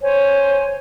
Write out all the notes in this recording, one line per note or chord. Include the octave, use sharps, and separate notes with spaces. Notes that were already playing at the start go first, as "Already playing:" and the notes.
C5 C#5 G#5